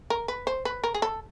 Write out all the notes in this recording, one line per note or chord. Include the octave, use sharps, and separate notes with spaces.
A#4
B4
C5
B4
A#4
G#4
A4